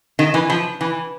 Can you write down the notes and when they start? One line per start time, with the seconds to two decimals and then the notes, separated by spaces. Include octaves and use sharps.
0.19 D#3
0.34 E3
0.50 F3
0.81 E3